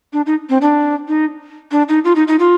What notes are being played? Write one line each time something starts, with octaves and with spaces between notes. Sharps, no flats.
D4
D#4
C4
D4
D#4
D4
D#4
F4
D#4
D#4
F4